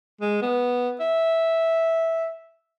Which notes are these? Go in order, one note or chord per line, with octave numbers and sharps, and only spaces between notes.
G#3
B3
E5